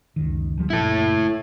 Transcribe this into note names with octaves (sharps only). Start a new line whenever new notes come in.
C#2 F#2 D#3
D2 F3 G3
F#1 A#2 E4 A4